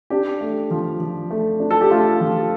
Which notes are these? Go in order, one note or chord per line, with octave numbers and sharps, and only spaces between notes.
D4 G4
A3
F3
F3
A3
D4
A4
G4
A3 F4
F3